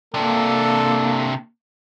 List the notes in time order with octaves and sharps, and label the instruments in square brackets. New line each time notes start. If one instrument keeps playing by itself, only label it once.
[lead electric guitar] C3 D4 [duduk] A#3 [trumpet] A4